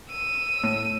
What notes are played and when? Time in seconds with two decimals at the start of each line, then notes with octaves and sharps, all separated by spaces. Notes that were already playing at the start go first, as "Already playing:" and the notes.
0.11 E6 D#7
0.64 A2